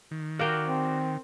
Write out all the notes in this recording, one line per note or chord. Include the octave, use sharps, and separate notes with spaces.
D#3
F#4 A#4 D5 F5 G5
C4